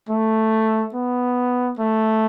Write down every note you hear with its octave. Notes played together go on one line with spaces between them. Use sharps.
A3
B3
A3